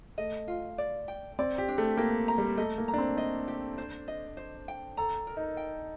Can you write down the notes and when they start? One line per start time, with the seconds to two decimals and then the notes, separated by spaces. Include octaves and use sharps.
0.18 A3 D#5
0.48 F4
0.78 D5
1.08 G5
1.39 C4 D5
1.58 G4
1.68 D4
1.78 A3
1.97 A#3 G5
2.28 A#5
2.38 G3
2.57 A3 D#5
2.78 A#3
2.88 A#5
2.94 D4
2.98 C4
3.17 D4 D#5
3.48 G4
3.78 C5
4.08 D#5
4.37 C5
4.68 G5
4.97 A4 A#5
5.27 A#4
5.37 D#4
5.57 G5